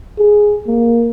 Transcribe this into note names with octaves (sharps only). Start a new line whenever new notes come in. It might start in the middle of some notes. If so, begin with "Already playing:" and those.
G#4
A#3